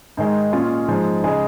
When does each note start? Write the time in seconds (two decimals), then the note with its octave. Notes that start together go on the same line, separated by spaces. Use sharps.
0.17 G#2 D#3 G#3 D#4
0.53 A#2 G#3 C#4 F4 G#4
0.88 G#2 F3 G#3
1.24 C#3 G#3 D#4 G#4